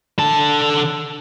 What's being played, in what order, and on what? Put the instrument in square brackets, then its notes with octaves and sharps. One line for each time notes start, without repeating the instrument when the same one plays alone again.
[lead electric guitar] D3 A5